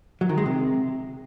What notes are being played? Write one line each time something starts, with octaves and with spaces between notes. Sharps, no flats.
F#3
D#3
G#3
C3